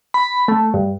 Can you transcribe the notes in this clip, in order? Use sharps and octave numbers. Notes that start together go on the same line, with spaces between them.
B5
A3
G2